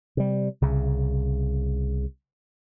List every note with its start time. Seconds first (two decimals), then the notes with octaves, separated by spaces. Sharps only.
0.17 C3 G3
0.61 C2 C#3